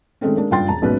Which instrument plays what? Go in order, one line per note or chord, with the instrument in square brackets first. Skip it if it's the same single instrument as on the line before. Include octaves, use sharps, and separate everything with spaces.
[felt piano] D#3 G#3 A3 C4 C#4
G#3 A#3 D4
F#1 G2 F4 G5 C6 A6
E1 A5 A#5
A#1 G#2 B2 C#4 B4